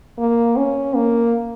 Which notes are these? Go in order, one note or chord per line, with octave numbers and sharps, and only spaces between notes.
A#3
C#4
A#3